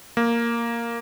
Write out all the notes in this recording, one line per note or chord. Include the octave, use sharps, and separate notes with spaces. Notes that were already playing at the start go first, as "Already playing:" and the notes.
A#3